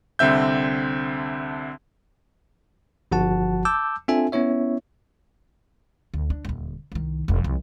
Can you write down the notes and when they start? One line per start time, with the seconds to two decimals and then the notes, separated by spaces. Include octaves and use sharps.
0.19 C2 D3 C4 E5 G6
3.11 G1 F3 F#4 F#5 A5
3.65 A5 D6 E6 G6
4.08 C4 D4 F4 A4 E5 G#5
4.32 B3 C#4 E4 C#5 E5
6.14 D2
6.30 D4
6.45 D#1 D2
6.92 C2 D#3
7.28 E1 F2
7.44 C2 F3